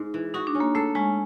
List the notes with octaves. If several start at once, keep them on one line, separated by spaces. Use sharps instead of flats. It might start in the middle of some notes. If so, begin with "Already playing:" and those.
Already playing: G#2
E3
D#4 F#4
D4
C#4
A#3
A3 A4
G#3 C#4